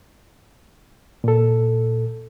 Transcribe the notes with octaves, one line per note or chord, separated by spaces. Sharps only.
A#2 A4